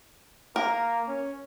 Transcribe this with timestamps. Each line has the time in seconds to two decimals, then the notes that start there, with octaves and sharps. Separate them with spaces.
0.56 A#3 A#4
1.08 C#4